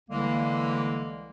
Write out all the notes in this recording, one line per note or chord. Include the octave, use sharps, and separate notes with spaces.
C2 D3 E3 G3 G#3 A#3